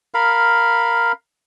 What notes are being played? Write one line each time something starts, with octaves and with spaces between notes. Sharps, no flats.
A#4 F5 B5